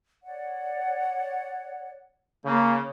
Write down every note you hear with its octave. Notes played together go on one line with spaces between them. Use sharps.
C#5 D5 F#5
C#3 A#3